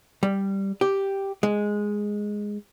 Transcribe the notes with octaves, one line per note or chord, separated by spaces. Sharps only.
G3
G4
G#3